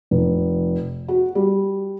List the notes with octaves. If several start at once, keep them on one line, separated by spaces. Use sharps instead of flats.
F1
F#4
G3